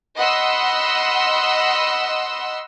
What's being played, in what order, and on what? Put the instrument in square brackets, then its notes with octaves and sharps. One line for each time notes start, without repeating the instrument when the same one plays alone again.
[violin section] D#5 F#5 B5 C6 E6